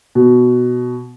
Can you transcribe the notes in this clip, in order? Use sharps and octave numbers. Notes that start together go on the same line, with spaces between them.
B2